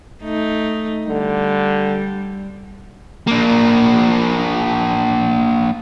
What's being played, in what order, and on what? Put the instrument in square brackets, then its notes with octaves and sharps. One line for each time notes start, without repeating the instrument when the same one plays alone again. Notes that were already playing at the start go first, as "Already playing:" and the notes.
[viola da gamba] A3 D#4
[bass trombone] D3 [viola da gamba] G3
[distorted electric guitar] A#3 D4